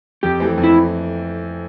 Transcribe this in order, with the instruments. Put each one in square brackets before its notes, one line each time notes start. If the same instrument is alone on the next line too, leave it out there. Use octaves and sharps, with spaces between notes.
[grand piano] F2 [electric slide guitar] G4
[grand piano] E3 A3 C4
F2
[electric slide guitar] E4